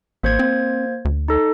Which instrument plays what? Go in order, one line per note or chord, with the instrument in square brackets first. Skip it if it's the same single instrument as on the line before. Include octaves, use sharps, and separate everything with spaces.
[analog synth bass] A1 [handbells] A#3 C5 G#6
[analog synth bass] C4
D2
[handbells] D#4 A4